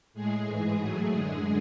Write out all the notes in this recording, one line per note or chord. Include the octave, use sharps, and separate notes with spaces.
A2 G#3 G#4
G#2 E3 G#3
A2 F#3 A3
F#2 D3 G#3